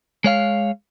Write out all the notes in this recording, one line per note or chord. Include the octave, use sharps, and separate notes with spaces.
G#3 C#5 F5